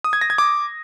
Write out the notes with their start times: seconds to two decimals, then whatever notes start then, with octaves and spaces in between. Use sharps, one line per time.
0.04 D#6
0.13 G#6
0.21 A#6
0.30 G#6
0.38 D6